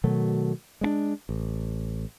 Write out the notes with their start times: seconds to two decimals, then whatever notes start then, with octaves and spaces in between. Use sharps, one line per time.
0.04 B2 D#3 F#3 A3
0.81 G#3 C4 D4
1.29 A1